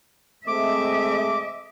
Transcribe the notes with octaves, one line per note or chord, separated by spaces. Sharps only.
G#3 A3 C4 D#5 E5 D6